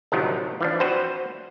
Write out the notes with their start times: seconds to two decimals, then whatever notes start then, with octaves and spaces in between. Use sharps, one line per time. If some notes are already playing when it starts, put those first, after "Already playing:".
0.12 D2 A2 C3 D#3 F3 F#3
0.61 E3 F3 D4
0.80 C4 F#4 B4 C5